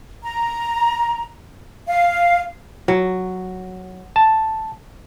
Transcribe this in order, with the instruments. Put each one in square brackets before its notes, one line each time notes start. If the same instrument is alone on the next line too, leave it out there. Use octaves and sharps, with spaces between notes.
[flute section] A#5
F5
[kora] F#3
[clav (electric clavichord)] A5